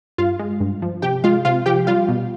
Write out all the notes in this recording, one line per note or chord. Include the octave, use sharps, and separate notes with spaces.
G2 F4 F5
G#3
G2
F3
C3 G4 G5
G#3 F4 F5
C3 F4 F5
F3 G4 G5
G3 F4 F5
B2